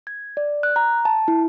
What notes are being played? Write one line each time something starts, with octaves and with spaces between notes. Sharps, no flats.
G#6
D5
F#6
A#5
A5
E4